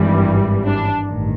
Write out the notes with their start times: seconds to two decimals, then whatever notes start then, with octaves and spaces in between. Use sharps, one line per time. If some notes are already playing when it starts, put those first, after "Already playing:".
Already playing: G#1 G2 E3 G3
0.66 D4
1.05 A1 G2 D#3